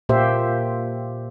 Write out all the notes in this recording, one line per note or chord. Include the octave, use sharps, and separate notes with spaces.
A#2 A#3 G4 C5 E5